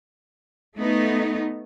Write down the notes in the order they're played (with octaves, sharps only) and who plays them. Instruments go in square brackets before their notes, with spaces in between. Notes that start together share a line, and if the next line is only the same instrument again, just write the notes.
[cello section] A3 B3 D#4